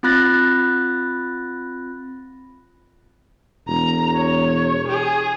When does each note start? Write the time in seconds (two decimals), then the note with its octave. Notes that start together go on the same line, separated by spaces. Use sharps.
0.03 C4 F4 B5 F#6 A6 A#6
3.67 E1 A#5
4.15 C#5
4.88 G#4